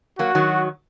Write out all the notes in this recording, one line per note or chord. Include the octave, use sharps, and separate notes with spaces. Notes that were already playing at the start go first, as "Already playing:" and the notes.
F#3 A#3 F#4
D#3 F#3